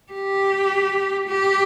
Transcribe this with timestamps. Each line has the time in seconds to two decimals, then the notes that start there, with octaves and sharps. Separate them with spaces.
0.12 G4
1.28 G4